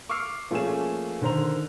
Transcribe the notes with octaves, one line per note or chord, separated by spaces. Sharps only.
C#6 D6 E6 F6 C7
F3 A3 A#3 C#4 G#4 E7
D3 D#3 C5 A#5 F7